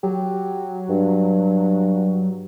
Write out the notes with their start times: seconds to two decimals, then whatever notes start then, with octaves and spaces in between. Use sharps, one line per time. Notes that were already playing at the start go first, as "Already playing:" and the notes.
0.03 F#3 G4
0.90 G2